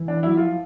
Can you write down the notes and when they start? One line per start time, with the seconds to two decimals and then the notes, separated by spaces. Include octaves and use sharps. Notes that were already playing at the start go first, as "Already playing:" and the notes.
Already playing: E3
0.08 D4
0.23 F#3 E4
0.37 F3 F4